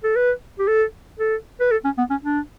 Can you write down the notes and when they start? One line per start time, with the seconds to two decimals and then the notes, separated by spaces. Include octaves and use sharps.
0.03 A4
0.16 B4
0.59 G4
0.68 A4
1.19 A4
1.60 B4
1.71 A4
1.84 C#4
1.98 B3
2.10 C#4
2.24 D4